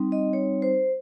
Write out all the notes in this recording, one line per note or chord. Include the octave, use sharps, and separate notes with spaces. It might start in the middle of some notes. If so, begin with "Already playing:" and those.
Already playing: G3 C4 D#4
D#5
C#5
C5